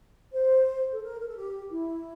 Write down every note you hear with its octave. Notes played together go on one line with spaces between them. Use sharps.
C5
A4
A#4
A#4
A4
G4
E4